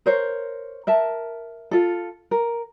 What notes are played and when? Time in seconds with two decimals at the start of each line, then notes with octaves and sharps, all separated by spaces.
0.06 A#4 C5 C#5
0.87 A#4 E5 A5
1.71 F4 A4
2.31 A#4